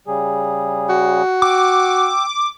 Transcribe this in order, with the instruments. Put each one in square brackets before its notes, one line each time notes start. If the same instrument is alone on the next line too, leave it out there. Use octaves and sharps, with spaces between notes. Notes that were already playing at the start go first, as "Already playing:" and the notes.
[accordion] C#3 G3 G#4
[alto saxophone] F#4
[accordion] G5 E6 [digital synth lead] D6